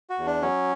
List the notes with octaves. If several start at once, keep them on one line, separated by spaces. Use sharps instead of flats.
F#4
E2
D4
F#3 C#4